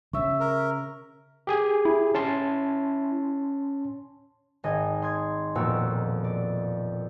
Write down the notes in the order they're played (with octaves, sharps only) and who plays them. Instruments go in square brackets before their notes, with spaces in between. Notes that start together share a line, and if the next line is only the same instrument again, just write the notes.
[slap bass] C#3 [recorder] E5 [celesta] C#6 E6
[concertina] A#4
[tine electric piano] G4 G#4 G#5
[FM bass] E4
[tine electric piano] C#4 A5 C6
[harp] G#1 D#5 G#5 G#6
C6 D#6 G#6
E1 F2 A#2 A#3 F#4 E6
D5